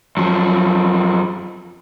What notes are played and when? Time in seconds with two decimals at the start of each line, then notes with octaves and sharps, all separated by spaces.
0.17 F#2 F3